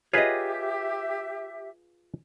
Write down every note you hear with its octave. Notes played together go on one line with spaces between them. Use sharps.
F4 G4 G#4 B4 C#5 D#5 E5